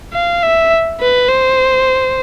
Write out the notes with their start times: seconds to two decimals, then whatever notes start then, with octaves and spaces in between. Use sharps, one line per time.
0.13 F5
0.42 E5
1.00 B4
1.29 C5